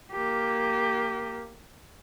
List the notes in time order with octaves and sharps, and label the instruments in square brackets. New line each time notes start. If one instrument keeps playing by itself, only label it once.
[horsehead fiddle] A#3 G4